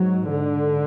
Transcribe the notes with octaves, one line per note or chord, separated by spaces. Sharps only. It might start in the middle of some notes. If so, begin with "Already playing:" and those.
Already playing: G#2 F#3
D3